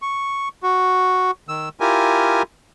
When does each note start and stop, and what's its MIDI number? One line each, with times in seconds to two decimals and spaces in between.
0.02 0.49 85
0.63 1.31 66
1.49 1.69 51
1.49 1.69 88
1.80 2.42 64
1.80 2.42 65
1.80 2.42 67
1.80 2.42 70
1.80 2.42 80